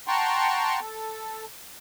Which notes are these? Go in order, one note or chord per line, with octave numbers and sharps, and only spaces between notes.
F#5 G5 A5 A#5 C6 C#6
A4